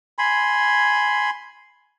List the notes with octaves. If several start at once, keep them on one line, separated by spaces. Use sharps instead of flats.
G#5 B5 C6